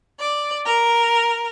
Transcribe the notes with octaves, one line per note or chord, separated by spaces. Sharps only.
D5
A#4